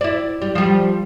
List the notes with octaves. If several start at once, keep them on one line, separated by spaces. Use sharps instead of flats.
E4 D5
G3
F3 G3